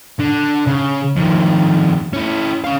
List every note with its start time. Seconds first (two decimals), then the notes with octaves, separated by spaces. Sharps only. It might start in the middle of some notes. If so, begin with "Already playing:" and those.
0.19 D3
0.67 C#3
1.16 F2 D#3
2.13 C#4 E4
2.64 C#4 F5